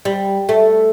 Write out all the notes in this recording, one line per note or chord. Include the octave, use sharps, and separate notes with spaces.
G3
A3